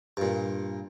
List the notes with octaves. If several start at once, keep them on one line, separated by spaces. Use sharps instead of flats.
G2 A#2